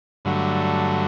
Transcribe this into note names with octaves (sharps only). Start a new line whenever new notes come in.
G2 D3 F#3 A3